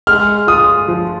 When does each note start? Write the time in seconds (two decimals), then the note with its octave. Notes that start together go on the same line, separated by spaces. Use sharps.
0.07 G#3 F6
0.47 F4 D#6
0.88 F3